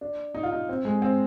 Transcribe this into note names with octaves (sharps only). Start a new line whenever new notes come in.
D4
D#4
F4
D#4
C4
G#3
C4